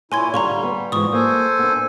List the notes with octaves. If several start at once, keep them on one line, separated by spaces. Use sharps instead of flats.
A#2 E4 C#5 G#5 C6 G#6
D3 G3 F5 A#5 C6 C#6
B3
G#2 E3 F3 C#6 D#6
A#3 A4 C5 G#5
B3 D4